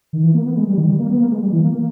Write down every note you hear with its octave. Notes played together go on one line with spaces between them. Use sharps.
D#3
E3
A#3
B3
G#3
G3
D#3
G3
A#3
B3
A#3
G#3
G3
E3
A#3
A#3